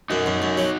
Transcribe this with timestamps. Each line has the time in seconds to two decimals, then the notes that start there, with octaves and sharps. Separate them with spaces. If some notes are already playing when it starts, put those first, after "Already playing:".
0.10 F#2 D#4 F#4
0.26 F#2
0.42 F#2
0.57 F#3